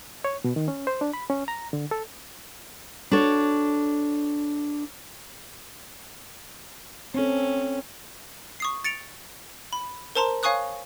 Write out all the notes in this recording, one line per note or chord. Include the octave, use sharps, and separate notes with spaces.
C#5
B2
D#3
C#4
C5
D4
B5
C#4
A#5
D3
A4
D4 F#4 A4 C#5
C4 C#4 A4
C#6 D#6 C7
A6 C#7 D7 F7
B5
A#4 C5 A5 A#5 C6
C#5 F5 G#5 C#6 D#6 F#6